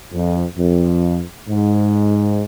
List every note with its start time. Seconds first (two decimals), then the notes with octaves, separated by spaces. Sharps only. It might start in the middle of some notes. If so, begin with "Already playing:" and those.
0.13 F2
0.57 F2
1.49 G#2